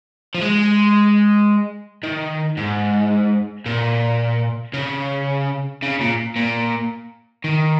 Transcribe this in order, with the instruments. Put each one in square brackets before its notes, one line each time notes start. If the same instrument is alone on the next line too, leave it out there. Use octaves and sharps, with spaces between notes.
[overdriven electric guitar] F3
G#3
D#3
G#2
A#2
C#3
C#3
A#2
A#2
D#3